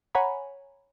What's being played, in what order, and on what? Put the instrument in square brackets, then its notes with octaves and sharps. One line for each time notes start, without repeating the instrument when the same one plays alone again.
[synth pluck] C#5 F#5 G#5 A#5 B5